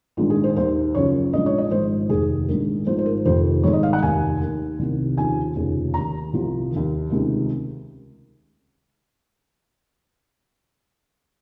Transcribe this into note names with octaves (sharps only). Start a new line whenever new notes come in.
A#1 G#2 D#3 F4
G#4
C5
D#2 D#3 C5
F#1 F#2 C#3 F3 C#5
A#1 G#2 F3 D#5
C#5
D#5
G#1 G#2 F3 C5
F1 D#2 D#3 G#4
A#1 G#2 D#3 A#4
G#1 G#2 F3 C5
C5
A#4
F1 F2 D#3 C5
G#1 G#2 D#3 C#5
D#5
F5
F#5
F1 D#2 D#3 G#5
D#2 D#3
C2 C3 D#3
D#2 C#3 F3 G#5
F1 D#2 C#3 F3
D#2 D#3 A#5
C2 C3 F3
D#3
D#2
C#2 C3 D#3